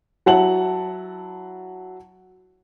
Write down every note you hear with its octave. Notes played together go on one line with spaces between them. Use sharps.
F#3 E4 F#5 A5 F#7